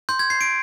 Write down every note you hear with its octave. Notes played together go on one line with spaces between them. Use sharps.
C6 G6
G#6
G6 C7
D7